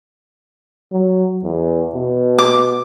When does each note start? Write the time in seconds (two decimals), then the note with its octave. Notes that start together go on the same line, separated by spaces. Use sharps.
0.92 F#3
1.44 E2
1.95 B2
2.38 D6